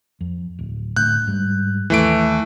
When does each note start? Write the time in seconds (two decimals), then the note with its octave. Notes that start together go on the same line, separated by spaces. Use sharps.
0.21 F2
0.59 D1
0.96 A2 D3 F#6 G6
1.27 G#2 G3
1.90 D#2 E3 A3 D7